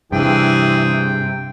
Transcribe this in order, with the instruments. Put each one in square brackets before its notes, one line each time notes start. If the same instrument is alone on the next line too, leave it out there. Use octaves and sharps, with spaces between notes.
[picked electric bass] G2 [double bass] C3 [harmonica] E3 G#4 [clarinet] G5